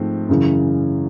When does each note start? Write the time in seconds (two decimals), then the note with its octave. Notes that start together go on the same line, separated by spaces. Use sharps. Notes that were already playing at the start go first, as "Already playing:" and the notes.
Already playing: G#2 F3 A3 C4
0.29 F#2 C#3 E3